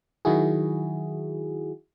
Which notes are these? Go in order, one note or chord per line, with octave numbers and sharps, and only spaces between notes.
D#3 F#3 E4 F#4 G#4